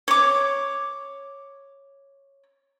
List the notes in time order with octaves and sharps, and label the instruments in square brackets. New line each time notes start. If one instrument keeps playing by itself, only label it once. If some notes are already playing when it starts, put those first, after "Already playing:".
[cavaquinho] C#5 D6